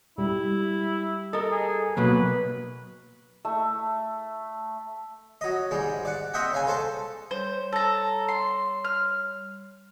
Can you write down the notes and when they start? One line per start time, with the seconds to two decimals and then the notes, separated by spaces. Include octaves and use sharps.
0.18 G3 E4
1.33 A4 A#4 D#5
1.51 G#4
1.97 B2 F#3 A#3 B4
3.45 A3
5.41 F#3 D#5
5.71 G#2 G3 G#3
6.05 D5 F#5
6.34 C4 D#5 E5 F#5 G5
6.53 C#3 F5 G#5
6.67 A4 C5 A5
7.31 G3 C5 C#5
7.73 A4 A#5
8.28 C6
8.85 F6